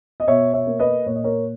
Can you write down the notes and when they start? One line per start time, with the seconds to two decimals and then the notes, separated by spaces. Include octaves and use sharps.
0.20 D#5
0.27 B2 C#5 E5
0.53 C#5 E5
0.67 A#3
0.79 B4 D#5
1.06 A#2 C#5
1.15 D#5
1.24 A#4 C#5